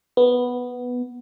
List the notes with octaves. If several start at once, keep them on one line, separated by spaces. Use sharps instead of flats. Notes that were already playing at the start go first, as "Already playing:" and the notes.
B3